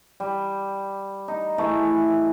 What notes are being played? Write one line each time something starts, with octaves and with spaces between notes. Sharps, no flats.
G3
D#4
E3 A3 E4 G#4